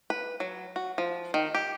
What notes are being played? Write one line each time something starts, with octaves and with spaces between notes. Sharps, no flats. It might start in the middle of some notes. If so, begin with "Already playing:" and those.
B4
F#3
F#4
F3
D#3
G4